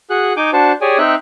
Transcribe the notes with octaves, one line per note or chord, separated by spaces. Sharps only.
F#4 G#4 F#6
D#4 G#5 D6 G6
D4 F#4 C5 A5
G4 G#4 C#5 D5 G#5
C4 D#4 E5 G5 F#6